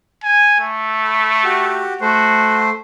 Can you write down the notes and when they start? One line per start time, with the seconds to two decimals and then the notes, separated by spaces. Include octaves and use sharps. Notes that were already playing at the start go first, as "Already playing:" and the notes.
0.24 G#5
0.61 A3
1.04 B5
1.44 F#4 G4
2.01 A3 F#4 C5